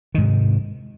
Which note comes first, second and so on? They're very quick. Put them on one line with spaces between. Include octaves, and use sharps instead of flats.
D#3 G#2 C3